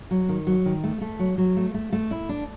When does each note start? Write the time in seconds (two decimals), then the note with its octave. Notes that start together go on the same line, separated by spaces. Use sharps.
0.11 F#3
0.29 D#3
0.47 F#3
0.66 D#3
0.84 A3
1.01 A3
1.19 F#3
1.38 F#3
1.57 A3
1.74 A3
1.93 A3
2.11 E4
2.29 D4